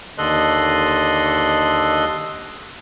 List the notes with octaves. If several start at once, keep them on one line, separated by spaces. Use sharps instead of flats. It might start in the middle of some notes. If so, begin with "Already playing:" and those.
D#2 D3 A4 D#5 C6 F#6